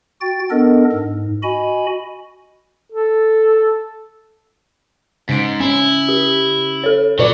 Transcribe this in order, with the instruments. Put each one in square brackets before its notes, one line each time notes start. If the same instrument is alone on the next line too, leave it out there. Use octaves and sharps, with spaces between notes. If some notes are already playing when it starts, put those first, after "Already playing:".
[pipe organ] F#4 G5 A6
B3 D4 A4 A#4 D#5
G#2
F#4 D#5 G#5 B5
[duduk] A4
[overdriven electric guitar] G#2 [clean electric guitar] C#3 [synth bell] B6 D7
[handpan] C#4 [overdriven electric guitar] E4 [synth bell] G#5
[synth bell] G4
A4 C#5
[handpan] A#2 B4 D5 [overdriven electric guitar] F#3